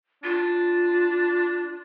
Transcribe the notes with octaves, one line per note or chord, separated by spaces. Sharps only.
D4 F4